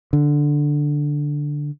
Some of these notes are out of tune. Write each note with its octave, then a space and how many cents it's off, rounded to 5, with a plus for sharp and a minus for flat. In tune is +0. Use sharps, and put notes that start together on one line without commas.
D3 +0